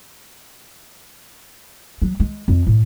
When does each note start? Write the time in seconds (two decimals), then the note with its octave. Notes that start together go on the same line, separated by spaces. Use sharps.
2.02 F#3
2.20 G#3
2.48 F2
2.66 A2